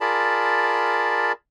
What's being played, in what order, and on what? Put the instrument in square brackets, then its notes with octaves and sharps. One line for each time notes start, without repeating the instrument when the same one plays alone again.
[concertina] F4 G#4 A#4 D5 A5 B5